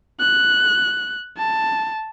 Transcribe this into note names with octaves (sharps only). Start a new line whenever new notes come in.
F#6
A5